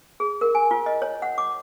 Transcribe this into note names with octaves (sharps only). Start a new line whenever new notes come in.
G#4
A#4
G#5
F4
D#5
C#5
F#5
D6